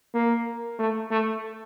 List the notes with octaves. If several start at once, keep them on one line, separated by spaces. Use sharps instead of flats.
A#3
A3
A3